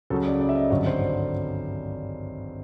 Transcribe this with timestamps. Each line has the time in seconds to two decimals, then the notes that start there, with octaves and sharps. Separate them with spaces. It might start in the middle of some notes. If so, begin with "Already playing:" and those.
0.10 C#2 C#3 F#3 A4
0.26 D5
0.41 D5
0.49 E5
0.56 D#5
0.70 G#1 G2 D3 F#3 C#5
0.86 C5